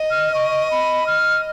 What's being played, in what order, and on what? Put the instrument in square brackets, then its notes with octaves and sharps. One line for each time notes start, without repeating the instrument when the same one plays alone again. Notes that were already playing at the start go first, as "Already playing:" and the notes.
Already playing: [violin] D#5
[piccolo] F6
C#6
B5
F6